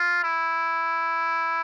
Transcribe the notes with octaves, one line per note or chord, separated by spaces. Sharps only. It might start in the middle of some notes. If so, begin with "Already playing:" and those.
Already playing: F4
E4